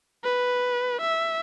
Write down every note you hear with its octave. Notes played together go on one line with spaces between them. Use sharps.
B4
E5